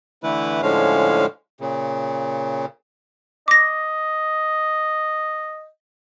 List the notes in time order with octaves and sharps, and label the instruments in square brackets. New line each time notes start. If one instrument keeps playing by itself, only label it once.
[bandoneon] D3 E3 A3 E4 B4
A2 D3 F3 G#3 C#4 F5
A#2 C#3
[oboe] D#5 [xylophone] D6 A#6